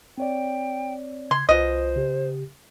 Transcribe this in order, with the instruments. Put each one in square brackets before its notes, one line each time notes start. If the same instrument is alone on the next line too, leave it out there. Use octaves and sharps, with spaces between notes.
[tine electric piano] C4 C#5 D5 [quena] G5
[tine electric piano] C#3 [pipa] C6 [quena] G#6
[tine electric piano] C2 F4 [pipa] B2 D#5 [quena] C5
[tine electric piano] C#3 G4